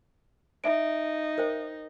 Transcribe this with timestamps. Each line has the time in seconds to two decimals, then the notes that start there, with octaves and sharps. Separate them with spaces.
0.64 D#4 E5 D7
1.38 A#4 C5 G5